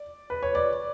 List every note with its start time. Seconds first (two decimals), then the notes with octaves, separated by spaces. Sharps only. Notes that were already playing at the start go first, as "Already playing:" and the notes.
Already playing: D5
0.30 B4
0.43 C#5
0.55 D5